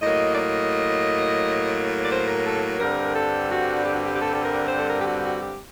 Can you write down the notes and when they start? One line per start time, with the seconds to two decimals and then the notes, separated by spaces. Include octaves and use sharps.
0.02 A2 F#3 A#3 D#5
0.32 D5
0.37 D#5
2.03 D5
2.11 C5
2.28 A#4
2.45 A4
2.80 G2 D3 G3 C4 A#4
3.15 A4
3.50 F#4
3.85 G4
3.94 F#4
4.04 G4
4.15 G4
4.20 A4
4.34 A4
4.43 A#4
4.66 C5
4.79 A4
4.89 A#4
5.00 G4
5.06 F#4
5.24 F#4
5.41 G4